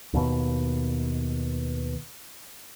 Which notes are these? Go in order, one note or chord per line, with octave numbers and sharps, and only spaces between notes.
D#2 B2